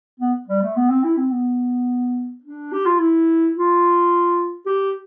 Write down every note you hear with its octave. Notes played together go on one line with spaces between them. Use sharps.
B3
G3
A3
B3
C4
E4
C4
B3
D4
G4
F4
E4
F4
G4